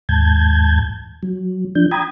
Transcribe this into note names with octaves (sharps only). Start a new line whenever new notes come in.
D#2 G#2 A5 G6 G#6
F#3
F3 D4 G6
G5 A#5 B5 D#6 G#6